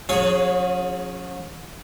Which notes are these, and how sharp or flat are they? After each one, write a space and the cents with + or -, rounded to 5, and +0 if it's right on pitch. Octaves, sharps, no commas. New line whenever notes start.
F#3 -45 C#4 +0 G#4 +0